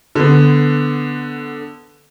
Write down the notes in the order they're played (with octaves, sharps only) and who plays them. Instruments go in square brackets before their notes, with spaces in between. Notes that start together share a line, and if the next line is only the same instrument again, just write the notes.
[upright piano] D3 B3